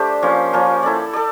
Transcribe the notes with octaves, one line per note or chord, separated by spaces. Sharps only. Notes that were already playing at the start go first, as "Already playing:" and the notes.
Already playing: A3 D4 G4 C5
F3 A#3 C#4 F4
F3 A#3 C#4 F4
E4 A4 D5
A4 D5